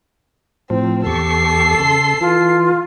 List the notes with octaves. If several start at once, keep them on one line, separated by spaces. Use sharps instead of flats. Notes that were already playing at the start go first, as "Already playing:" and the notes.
A2 F3 C4
E2 G4 A4 C#6 C7
C#3 C6
E3 F4